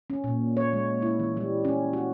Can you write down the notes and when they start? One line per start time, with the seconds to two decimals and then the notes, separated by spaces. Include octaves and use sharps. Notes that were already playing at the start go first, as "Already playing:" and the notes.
0.10 C#4
0.24 A#2
0.57 C#5
0.73 G#3
1.02 E4
1.20 E3
1.37 G3
1.65 C#4
1.93 F#4